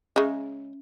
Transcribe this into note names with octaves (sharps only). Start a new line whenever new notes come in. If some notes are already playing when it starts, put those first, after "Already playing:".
C#3 G#3 C#4 E5